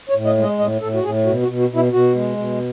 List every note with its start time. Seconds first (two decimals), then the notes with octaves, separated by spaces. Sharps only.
0.09 C#5
0.15 A2
0.26 D#5
0.37 G#3
0.43 D#5
0.59 A2 D#5
0.81 A2 A4
0.94 F#4
1.04 A2 G#4
1.26 B2 F#4
1.43 F#4
1.48 B2
1.59 F#4
1.70 B2
1.75 E4
1.93 B2 F#4
2.15 G#3
2.37 B2